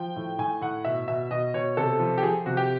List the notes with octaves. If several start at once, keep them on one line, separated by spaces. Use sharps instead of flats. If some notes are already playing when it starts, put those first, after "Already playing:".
Already playing: F3 G5
A2
A2 G#5
A2 F#5
B2 E5
B2 E5
B2 D#5
B2 C#5
C3 A4
F3
G4
F3 G#4
C3 F#4
G4